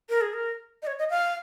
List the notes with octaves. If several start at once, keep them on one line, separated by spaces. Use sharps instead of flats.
A#4
G#4
A#4
D#5
C#5
D#5
F5